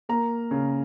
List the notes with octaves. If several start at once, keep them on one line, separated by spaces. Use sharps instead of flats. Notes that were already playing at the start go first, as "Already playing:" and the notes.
A#3 A#4 A#5
C#3